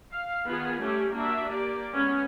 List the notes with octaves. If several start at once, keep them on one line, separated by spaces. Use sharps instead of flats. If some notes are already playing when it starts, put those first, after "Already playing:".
F5
D#3 B3 F4 G#4
G3 A3 C#4 G4
A#3 D4 F#4 E5
A#3 G4 D5
G#3 B3 C#4